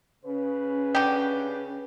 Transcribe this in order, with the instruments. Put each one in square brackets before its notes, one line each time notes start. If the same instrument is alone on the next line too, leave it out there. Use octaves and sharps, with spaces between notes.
[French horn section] C#3 B4 [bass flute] C#4
[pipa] D3 G4